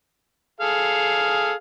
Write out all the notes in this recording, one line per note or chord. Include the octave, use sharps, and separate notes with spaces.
G#4 A4 F5